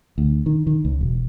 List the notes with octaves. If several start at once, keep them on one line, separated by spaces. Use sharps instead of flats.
D2
D#3
D#3
C#2
E1